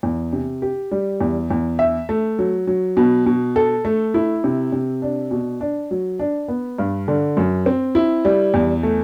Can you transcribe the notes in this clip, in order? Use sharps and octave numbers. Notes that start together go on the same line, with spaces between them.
E2
C3
G4
G3
E2
E2
E5
A3
F#3
F#3
B2
B2
A4
A3
E4
C3
C3
D4
B2
D4
F#3
D4
B3
G2
D3
F#2
C4
E4
G3
E2
A3